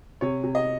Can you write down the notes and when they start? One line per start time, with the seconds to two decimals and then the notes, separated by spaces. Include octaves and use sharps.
0.21 C3 C#5
0.43 C3
0.55 D#5